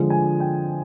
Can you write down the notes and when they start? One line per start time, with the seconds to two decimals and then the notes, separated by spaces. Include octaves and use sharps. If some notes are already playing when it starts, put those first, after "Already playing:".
Already playing: D3 F3 G#3
0.10 G#5
0.40 G5